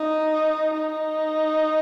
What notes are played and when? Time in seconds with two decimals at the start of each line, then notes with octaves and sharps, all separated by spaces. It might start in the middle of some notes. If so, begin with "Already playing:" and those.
Already playing: D#4
0.74 D#4